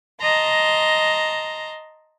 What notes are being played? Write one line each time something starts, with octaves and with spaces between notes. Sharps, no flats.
D#5 A5 A#5 C6